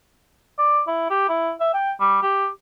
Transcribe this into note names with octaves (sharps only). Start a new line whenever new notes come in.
D5
E4
G4
E4
E5
G5
G3
G4